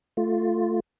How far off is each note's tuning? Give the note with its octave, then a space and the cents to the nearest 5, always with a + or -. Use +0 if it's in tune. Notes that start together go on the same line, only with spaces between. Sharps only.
A3 +0 F4 +0